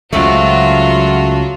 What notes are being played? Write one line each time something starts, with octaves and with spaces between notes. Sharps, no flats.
C#2 C#3 F#3 A3 C4 D4 F4 F#4